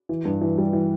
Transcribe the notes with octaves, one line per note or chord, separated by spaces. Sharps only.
E3
G2
E3
G3
E3